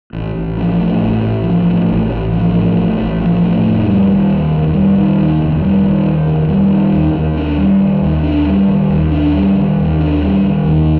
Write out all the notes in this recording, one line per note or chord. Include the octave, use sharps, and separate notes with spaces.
A1
A1
F3
A2
A1
A1
F3
A2
A1
A1
F3
A2
A1
A1
F3
A2
F1
G3
D#3
D#2
F1
G3
D#3
D#2
F1
G3
D#3
D#2
F1
G3
D#3
D#2
D#2
D4
G3
D#3
D#2
D4
G3
D#3
D#2
D4
G3
D#3
D#2
D4
G3
D#3
D#2